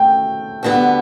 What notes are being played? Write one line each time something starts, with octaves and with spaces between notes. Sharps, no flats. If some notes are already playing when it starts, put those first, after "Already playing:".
Already playing: A3 C4 G5
D2 D3 G3 B3